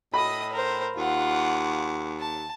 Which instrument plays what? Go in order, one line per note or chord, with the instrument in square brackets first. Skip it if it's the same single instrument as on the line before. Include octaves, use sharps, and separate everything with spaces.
[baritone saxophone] A2 [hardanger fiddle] D#5 D#6 [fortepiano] B5
[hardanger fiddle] A#4 C5
[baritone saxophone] D#2 [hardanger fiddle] F4 F#5
[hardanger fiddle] A5